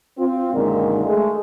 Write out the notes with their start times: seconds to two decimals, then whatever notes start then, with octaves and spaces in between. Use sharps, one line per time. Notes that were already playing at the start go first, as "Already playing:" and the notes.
0.18 C4 F4
0.53 F#2 A#2 D3 D#3 G#3
1.05 G#3 A3